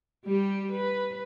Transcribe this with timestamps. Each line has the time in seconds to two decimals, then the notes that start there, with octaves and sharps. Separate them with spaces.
0.25 G3 G4
0.72 B4